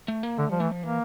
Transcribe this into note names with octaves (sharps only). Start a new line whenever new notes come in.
A3
A#3
D3 A3
F3 G3
E3 A3
F3
E3 A#3